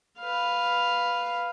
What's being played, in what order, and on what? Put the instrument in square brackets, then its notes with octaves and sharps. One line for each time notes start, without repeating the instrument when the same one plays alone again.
[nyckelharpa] B4 F5